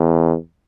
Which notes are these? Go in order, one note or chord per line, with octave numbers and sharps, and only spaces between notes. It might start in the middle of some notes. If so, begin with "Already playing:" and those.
Already playing: E2